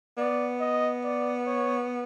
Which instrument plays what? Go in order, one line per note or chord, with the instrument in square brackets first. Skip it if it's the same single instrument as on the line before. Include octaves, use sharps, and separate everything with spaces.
[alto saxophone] B3 [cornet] D5
[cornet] D#5
D5
C#5